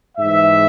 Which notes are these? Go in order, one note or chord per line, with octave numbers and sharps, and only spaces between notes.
G#2 E3 G#3 E5